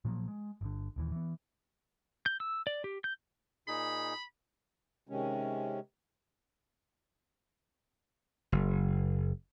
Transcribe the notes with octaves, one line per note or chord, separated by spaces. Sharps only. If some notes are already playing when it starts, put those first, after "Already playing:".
A#2 F3 F#3 A#3
G#3
G1 D3
D#1 D#2 E3
E3 B3
G6
E6
D5
G4
G6
A#2 D#4 G#4 B5
C3 D#3 G#3 C#4
F#1